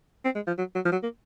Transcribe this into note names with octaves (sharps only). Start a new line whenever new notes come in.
C4
G#3
F3
F#3
F#3
F3
F#3
A#3